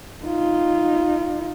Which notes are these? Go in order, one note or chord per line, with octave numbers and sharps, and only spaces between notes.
D#4 F4